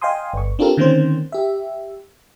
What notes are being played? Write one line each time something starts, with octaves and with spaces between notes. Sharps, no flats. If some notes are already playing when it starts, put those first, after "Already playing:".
D#5 F5 G5 G#5 C6 D#6
G1 C#6
C4 D4 F4 G4 A4 A#4
D3 D#3 A#3 C4 C#4 C5
G4 E5